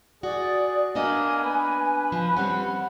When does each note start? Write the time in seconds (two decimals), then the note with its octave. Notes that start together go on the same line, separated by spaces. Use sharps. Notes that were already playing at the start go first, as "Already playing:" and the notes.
0.23 F#4 G#4 D5
0.96 A#3 B3 D4 D#5 G#5
1.44 B4
2.12 F3 B5
2.36 G3 C4 C#4 F#5